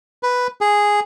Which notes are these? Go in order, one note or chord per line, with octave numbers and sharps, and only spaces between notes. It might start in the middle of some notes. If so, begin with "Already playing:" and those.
B4
G#4